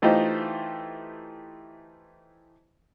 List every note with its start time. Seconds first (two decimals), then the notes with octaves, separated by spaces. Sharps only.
0.02 E3 A3 D#4 F4 G4 C5